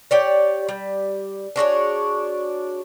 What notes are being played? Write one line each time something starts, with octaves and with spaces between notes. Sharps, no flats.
G4 C#5 D5
G3
D4 F#4 G#4 C#5